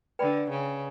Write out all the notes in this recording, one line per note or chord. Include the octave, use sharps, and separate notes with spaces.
D3 B4 D5 G5 B5
C#3